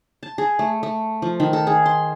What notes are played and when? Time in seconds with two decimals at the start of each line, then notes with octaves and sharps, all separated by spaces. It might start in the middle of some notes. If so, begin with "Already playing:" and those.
0.23 A5
0.38 G#4
0.59 A3
0.83 A3
1.22 F3
1.40 D#3
1.53 A4
1.67 G#4
1.86 C6